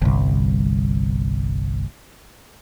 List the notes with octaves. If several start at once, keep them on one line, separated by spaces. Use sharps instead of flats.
G1 C2